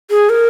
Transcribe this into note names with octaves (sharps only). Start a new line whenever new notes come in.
G#4
A#4